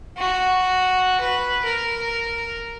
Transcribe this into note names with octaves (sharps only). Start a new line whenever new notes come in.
F#4
B4
A#4